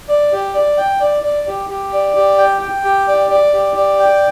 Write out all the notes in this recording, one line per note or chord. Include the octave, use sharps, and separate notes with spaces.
D5
G4
D5
G5
D5
D5
G4
G4
D5
G4
G5
G5
G4
D5
D5
G4
D5
G5